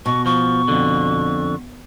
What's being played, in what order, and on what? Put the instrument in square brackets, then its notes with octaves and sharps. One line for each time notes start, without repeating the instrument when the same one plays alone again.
[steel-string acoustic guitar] B2 [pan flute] C#6
[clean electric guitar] F3 [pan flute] C#6
[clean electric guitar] F2 D3